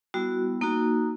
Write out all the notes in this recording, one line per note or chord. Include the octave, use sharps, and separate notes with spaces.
G3 B3 E4 F#4
A#3 D#4 F#4